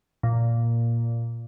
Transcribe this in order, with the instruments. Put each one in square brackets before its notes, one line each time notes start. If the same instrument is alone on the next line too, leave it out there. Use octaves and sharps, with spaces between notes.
[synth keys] A#2